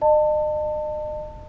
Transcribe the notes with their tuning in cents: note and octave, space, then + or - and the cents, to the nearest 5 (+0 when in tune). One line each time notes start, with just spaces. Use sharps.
D#5 -40 A5 +25